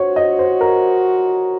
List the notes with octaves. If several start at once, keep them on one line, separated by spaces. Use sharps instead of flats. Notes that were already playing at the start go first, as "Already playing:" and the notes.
Already playing: F#4 C5 C#5
D#5
C5
A#4